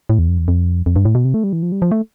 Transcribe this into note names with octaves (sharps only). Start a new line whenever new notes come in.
A2
E2
F2
E2
F2
F2
G2
A2
B2
C3
A3
G3
E3
F3
G3
F3
A3